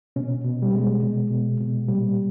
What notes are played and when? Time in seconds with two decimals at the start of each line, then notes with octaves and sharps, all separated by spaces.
0.16 B2 C#4
0.44 B2
0.62 G3
0.73 B2 G#3
1.03 B2
1.31 B2
1.60 B2
1.89 A#2 G3